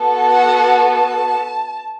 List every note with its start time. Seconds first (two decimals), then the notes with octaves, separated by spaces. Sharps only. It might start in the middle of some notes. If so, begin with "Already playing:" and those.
Already playing: B3 F#4 A4
0.33 F#5
0.80 A5